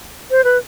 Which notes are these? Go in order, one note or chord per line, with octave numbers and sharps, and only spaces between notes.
C5
B4